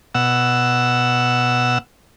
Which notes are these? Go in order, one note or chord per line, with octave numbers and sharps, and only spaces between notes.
B2 F#5 E6